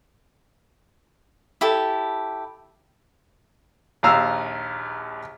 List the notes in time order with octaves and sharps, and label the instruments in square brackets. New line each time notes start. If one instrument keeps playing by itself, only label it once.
[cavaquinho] E4 G4 A4
[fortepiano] A#1 D#2 F5 A#5 E6